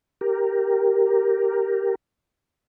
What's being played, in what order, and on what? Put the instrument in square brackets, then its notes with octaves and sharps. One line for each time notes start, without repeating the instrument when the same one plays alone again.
[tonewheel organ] G4 A#4